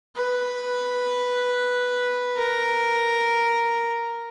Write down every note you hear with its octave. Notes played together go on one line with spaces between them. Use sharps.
B4
A#4